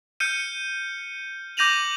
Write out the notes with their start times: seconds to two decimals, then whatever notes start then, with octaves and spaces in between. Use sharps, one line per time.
0.20 F6 G6 C#7 D#7
1.57 D6 G6 A#6 D#7 F7 F#7